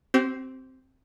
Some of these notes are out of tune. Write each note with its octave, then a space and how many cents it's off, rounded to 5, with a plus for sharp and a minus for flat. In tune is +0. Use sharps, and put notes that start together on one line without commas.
C4 +0 G4 -40